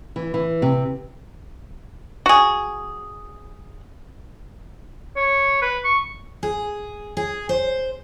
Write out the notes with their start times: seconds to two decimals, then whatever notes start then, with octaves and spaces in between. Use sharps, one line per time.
0.16 E3
0.34 E3
0.62 C3
2.26 F#4 G#4
5.16 C#5
5.62 B4
5.84 C#6
6.43 G#4
7.17 G#4
7.49 C5